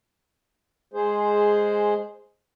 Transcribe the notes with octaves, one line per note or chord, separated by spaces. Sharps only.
G#3 G#4 C5